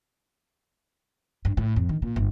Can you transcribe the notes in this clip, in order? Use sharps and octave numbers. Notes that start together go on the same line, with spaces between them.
G2
A2
F2
D#3
A#2
G1